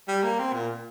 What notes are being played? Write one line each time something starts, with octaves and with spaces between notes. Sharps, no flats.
G3
A#3
C4
A#2